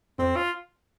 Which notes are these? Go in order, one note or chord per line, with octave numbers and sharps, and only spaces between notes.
F2 C4
F4